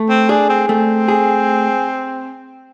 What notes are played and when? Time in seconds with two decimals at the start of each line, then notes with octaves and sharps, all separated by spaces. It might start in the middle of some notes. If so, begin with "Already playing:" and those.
Already playing: A3
0.09 C4
0.29 D4 G#4
0.49 C4
0.68 A3 C4
1.08 G#4